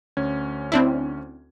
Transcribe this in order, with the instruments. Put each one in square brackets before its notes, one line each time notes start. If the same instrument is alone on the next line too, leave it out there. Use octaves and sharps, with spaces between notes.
[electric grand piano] D2 C#4 G#6
[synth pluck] C4 D4 E4